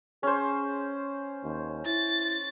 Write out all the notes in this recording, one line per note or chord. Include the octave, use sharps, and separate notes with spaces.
C#4 G#4 C5
D#2
E4 A6